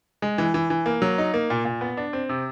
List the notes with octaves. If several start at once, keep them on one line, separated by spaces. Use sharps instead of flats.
G#3
E3
E3
E3
A#3
F#3
D#4
A#3
A#2
A#2
B3
D4
C4
C3